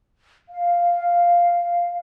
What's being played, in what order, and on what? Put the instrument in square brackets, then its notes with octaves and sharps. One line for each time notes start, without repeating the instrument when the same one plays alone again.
[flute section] F5